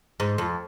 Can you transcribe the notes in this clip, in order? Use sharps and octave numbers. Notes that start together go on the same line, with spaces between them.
G#2
F2